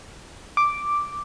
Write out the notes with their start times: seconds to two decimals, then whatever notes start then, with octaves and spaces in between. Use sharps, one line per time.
0.57 D6